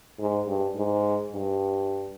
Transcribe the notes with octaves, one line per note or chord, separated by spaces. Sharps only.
G#2
G2
G#2
G2